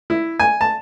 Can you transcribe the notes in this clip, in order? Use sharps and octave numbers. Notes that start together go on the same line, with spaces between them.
E4
G#5
A5